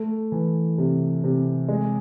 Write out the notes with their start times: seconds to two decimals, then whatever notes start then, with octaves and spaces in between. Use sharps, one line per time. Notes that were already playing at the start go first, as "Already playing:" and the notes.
Already playing: A3
0.32 E3
0.78 C3
1.24 C3
1.69 G#3